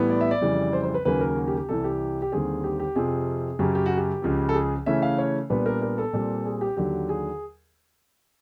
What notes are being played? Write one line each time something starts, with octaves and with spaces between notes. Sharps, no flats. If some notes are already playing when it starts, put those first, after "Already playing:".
Already playing: A2 E3 G3 B3
D5
E5
D5
F2 C#3 E3 G3
C5
C5
B4
D#2 C#3 F#3 A#3 C#4 B4
A#4
F#4
G4
G4
C2 C3 E3 A4
G4
G4
D#2 D3 G3 C4 G#4
G4
G4
F2 C3 F3 G#4
F#2 C#3 F#3 G4
G4
F#4
G4
C#2 C#3 F3
A4
G#4
C#3 E3 A3 C#4 E5
F5
C#5
A#2 G3 B3 D4 B4
A#4
A#4
A4
A#2 G3 C4
G#4
G4
D#2 D3 F#3 G4
G#4